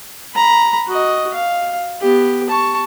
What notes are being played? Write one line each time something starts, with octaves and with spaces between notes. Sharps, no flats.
A#5 B5
F#4 D#5
F5
B3 G4
A5 C#6